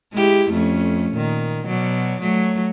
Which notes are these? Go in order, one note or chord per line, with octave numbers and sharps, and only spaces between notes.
G#3 E4 G4
F2 A3 C#4
A#2 D#3
B2 F#3 D5
F#3 A3